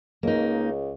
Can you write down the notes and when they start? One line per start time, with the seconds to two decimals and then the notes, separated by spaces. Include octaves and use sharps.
0.23 C#2 A#3 D#4